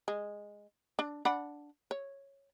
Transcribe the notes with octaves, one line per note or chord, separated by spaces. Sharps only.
G#3
D4
D4 F#5 B5
C#5